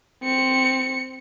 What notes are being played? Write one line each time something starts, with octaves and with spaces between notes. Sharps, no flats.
C4 C#7